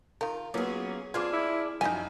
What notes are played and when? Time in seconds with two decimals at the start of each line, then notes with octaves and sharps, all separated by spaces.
0.21 D#3 F4 A#4
0.54 F#3 A#3 B3 C#4 F4 G#4
1.14 E3 C4 D4 F4 G#4 D6 F6 G#6
1.33 E4
1.81 F#2 F3 F#3 D#4 D#5 G5 G#5